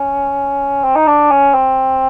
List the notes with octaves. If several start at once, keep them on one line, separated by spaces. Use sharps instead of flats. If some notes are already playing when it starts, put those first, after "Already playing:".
Already playing: C#4
C4
D#4
D4
C#4
C4